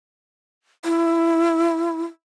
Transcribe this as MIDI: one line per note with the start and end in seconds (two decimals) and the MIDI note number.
0.85 2.03 64